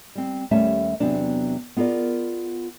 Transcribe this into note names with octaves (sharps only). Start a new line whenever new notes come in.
G3 C4
D#2 G3 A3 C#4 E5 A5
E2 C3 F#3 B3 D4
B3 F4 G#4 A#4 D5